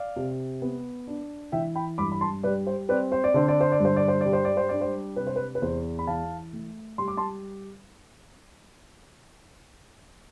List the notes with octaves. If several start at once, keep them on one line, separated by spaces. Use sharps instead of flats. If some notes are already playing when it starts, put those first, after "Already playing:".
Already playing: D5 F5
C3
B3
D4
E3 E5 G5
G5 B5
G2 B5 D6
B5
A5 C6
G3 B4 D5
C5
C4 B4 D5
C5
D5
D3 C5
D5
C5
D5
G2 C5
D5
C5
G3 D5
C5
D5
C5
D4 D5
C5
C3 B4
C5
B4
B4
E2 C5
B5
E3 F5 A5
A3
G3 C6
D6
A5 C6